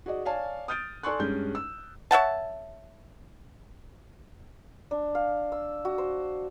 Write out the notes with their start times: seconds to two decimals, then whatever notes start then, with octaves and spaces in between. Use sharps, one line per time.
0.06 F#4 G#4 D5 D#5
0.25 C#5 D5 F5 G#5 A5
0.68 D#6 F6 G6 A6 D7
1.03 A4 D5 G#5 C6 C#6 F#6
1.20 G2 G#3 C#4 G6
1.55 E6
2.11 C#5 E5 F#5 A5
4.91 D4
5.15 F5
5.52 E6
5.85 F#4
5.98 C5